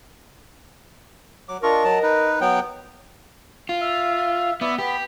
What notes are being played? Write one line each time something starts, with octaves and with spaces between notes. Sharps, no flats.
F#3 D6
D4 F4 A#4 D#5 C#6
F#3 A5
D#4 B4
F#3 B3 G5
F4
E5 F5
B3 E4 D5 E5
B3 G4 B5